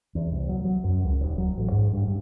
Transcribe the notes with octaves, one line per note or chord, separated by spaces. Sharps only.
E2
C2
F#3
F#3
F#2
C#2
D#1
F#3
A1
G#2
G2
G2